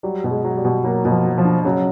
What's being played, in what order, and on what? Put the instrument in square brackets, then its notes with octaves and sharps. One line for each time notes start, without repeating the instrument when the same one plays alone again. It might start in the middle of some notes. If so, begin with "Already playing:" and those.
[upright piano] F#3 [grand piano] G3
[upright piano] B2
[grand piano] G#3
[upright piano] F#3
[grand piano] G3
[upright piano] B2
[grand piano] F#3 [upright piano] A#3
[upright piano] B2
[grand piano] F3
[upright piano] F#3
[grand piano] F3
[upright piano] D4
[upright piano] C#3 [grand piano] F#3